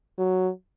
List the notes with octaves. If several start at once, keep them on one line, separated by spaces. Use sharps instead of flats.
F#3